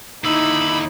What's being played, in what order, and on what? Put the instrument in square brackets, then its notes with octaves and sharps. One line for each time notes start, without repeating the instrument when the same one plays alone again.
[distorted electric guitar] D#2 D3 [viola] D#4 E4 [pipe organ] B5 E6